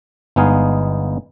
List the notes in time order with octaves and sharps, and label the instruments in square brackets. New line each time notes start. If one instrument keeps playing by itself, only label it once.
[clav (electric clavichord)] G1 G#3 B3 D#4 G#4 F5